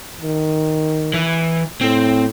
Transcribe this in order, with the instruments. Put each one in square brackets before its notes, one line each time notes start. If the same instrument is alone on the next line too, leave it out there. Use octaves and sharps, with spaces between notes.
[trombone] D#3
[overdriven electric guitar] E3
[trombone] A2 [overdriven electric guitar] C4